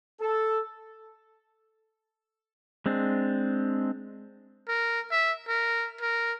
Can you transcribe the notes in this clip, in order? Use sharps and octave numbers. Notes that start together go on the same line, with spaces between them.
A4
G#3 C4 D4
A#4
E5
A#4
A#4